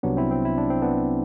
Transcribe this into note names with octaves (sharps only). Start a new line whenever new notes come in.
C2 C3 F#3 B3 D4
C4 E4
C4
E4
D4
C4
B3 D4